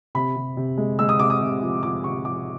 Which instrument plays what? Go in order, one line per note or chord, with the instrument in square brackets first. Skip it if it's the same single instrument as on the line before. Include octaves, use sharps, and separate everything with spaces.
[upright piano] C3 B5
C3
C3
G#3
G#3 E6
D#6
C3 D6
D#6
C3
F3
F3 D6
C3 C#6
F3 D6